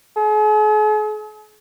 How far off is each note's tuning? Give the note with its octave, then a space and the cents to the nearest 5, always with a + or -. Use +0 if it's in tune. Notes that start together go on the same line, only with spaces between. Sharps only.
G#4 +45